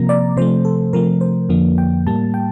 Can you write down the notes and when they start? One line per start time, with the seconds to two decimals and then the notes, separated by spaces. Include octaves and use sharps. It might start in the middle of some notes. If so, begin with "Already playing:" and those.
Already playing: C3 F3 A#3 A#5
0.09 D5
0.37 C3 F3 A3 C5
0.65 A4
0.93 C3 F3 A3 A#4
1.21 C5
1.49 F2 D3 F3 A#3
1.78 G5
2.07 A2 G3 A#3 A5
2.34 G5